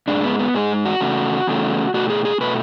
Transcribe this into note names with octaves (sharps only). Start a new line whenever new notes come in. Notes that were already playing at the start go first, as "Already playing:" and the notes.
G#2 G#3 D4
B3
B3
G#2 G#3 G#4
F#4
E2 C#3 A3
E2 C#3 A3
B2 A3 F#4
G#4
G#4
B2 A3 B4